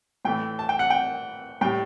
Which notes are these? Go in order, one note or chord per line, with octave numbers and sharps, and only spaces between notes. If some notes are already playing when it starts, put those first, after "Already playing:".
A2 E3 A3 G5
A5
G5
F#5
G5
A2 G3 G5